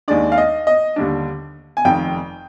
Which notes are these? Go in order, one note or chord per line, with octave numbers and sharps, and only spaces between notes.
D#2 D#3 G#3 D4 D5
F5
D#5
D#5
D#2 D3 G3 D4
G#5
F1 F2 D#3 G5